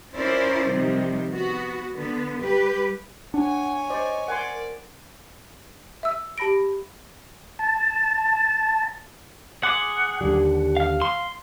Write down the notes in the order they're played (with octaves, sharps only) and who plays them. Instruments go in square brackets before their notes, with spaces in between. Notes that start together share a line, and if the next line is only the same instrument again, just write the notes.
[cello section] C#4 E4 F4 A#4 C5 D5
C3 D#3 F3 G3
B3 F#4
D3 B3
G3 G4 B4
[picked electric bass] D4 [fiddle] C#5 G#5 [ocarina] F#5
[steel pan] C5 D5 [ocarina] D#5
[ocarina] A#4 [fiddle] D5 [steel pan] F#5 G#5 C6
[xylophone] E5 E6
G4 A5 B5 A#6 D7
[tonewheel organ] A5
[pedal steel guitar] G#4 C6 D6 [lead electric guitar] F#5
[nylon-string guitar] D#2 D3 G3
[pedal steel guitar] F5 F6
[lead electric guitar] C6